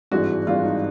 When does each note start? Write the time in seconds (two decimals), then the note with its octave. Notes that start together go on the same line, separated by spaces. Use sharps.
0.11 G#1 G2 E3 G#3 F#4
0.47 G#1 G2 E3 G#3 F4
0.64 D#4